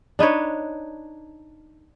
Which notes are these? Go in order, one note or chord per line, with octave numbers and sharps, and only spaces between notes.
D4 D#4 B4 C#5